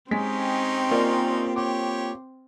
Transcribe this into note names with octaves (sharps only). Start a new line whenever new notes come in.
G#3 C4 C#4 D#4 G4 B6
A#3 F4 A#4 D5 D#5
G4 C#5 D6